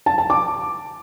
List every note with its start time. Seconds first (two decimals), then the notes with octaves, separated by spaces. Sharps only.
0.06 A5
0.18 A5
0.30 D6